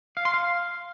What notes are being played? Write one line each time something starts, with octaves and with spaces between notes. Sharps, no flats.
F5
C6
F5